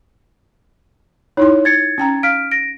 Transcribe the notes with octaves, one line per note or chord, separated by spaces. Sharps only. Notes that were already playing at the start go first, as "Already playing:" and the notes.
D#4 E4 C#5 C6
C#5 G#6 A6 C#7
C#4 G5 A#5
F5 F6 B6 D7
A#6 D7